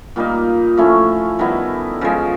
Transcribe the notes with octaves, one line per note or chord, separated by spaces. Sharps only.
A#2 G3 A#3 D#4
F3 A3 C#4 E4
D#3 G3 B3 E4
C#3 F3 G#3